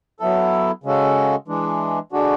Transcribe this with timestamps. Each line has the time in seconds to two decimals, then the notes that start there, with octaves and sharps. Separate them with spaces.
0.20 F#3 B3 E4 A4
0.84 C#3 G#3 C#4 F#4 A4
1.48 E3 G#3 D4
2.12 D3 G#3 D4 F#4